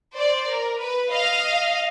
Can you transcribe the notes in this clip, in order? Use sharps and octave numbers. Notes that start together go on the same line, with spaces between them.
C5 D5
A#4
B4
D#5 F5